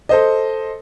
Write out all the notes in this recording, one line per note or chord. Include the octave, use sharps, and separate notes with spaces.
A4 C5 D#5